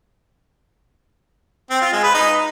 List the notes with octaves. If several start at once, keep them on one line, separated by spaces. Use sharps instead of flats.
C4
F4
G#3
B4
D#4